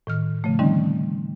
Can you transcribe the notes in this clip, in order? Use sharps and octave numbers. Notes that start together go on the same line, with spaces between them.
A2 D#3 F6
C#3 F3 A3
D3 D#3 G3 C4 C#4 D#4